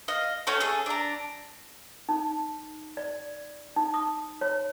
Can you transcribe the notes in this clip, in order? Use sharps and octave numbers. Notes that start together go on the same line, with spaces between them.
D#5 F5
A3 C#4 F#4 A4
G#4 A4
D4 A#5
D#4
D5
D#4
D#6
C#5